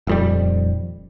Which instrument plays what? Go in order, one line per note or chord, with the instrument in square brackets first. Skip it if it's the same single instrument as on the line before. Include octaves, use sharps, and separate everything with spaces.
[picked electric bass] D#1 F2 G3